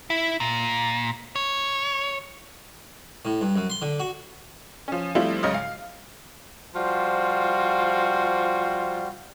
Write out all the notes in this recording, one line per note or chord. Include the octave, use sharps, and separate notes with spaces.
E4
A#2
C#5
A2
G2
F#2
C6
D3
F#4
F3 C#4
F3 G3 A3 C4 E4 F4
B1 G#2 C#3 C#5 D#5 F6
F5
F3 G3 F4 F#4 C5